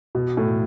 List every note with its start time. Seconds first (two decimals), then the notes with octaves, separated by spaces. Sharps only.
0.15 B2
0.37 A2